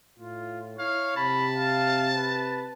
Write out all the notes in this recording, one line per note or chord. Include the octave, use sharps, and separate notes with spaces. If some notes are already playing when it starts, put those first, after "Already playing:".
A2 F4
E4 C#5 F5
C3 A5 B5
F5
B4